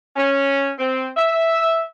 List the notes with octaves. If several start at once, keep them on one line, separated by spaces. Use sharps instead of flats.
C#4
C4
E5